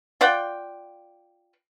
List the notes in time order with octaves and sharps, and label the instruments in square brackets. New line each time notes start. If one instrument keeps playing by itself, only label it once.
[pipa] F4 D5 F#5 G5